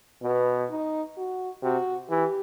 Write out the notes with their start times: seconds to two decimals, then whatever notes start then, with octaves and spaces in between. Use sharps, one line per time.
0.22 B2 B3
0.70 D#4
1.17 F#4
1.63 C3 F#4
2.10 E3 G4